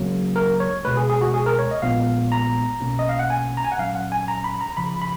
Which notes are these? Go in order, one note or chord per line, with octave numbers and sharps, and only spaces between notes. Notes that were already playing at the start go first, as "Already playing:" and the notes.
Already playing: C#2 C#3 F#3 A#3
A#4
C#5
C#2 B2 G#3 B4
G#4
G#4
F#4
G#4
A#4
C#5
D#5
A#1 A#2 G#3 B3 F5
A#5
B1 B2 A#3 C#4
D#5
F5
F#5
G#5
A#5
G#5
F#5
A#2 F#3 C#4 F5
F#5
G#5
A#5
B5
A#5
C#2 C#3 F3 B5
B5